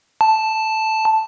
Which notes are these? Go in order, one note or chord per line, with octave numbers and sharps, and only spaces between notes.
A5